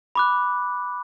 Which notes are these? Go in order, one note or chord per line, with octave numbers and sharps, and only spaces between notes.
B5 D6 F#6